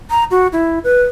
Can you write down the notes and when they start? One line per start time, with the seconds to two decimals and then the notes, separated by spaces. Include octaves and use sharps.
0.10 A#5
0.31 F#4
0.53 E4
0.84 B4